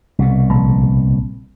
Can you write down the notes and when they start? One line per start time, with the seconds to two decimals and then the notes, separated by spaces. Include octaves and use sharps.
0.19 C2 B2
0.50 A#1